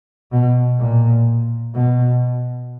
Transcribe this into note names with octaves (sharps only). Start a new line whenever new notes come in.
B2
A#2
B2